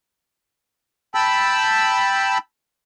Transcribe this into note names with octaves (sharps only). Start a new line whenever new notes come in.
G5 A5 B5 E6